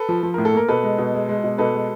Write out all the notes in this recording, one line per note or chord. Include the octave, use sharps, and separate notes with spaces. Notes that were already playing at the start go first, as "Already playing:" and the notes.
Already playing: A4 B4
F3
F3
A2 A#4
A4
A#3 A#4
B2 A4 B4
G#3
B2
G#3
G#3
B2
B2 A4 B4
G#3